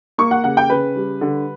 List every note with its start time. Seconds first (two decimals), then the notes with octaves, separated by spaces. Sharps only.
0.18 A#3 C#6
0.31 F#5
0.44 C#3 F#5
0.57 G5
0.70 C#3 B4
0.96 G3
1.21 D3